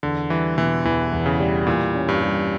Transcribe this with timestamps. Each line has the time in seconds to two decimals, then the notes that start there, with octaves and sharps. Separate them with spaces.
0.03 E2 D3
0.30 E3 G3
0.58 B2 E3
0.85 E2 E3
1.12 E2
1.26 C#3
1.40 G3
1.67 A#2 E3
1.94 C#4
2.08 G2
2.22 G3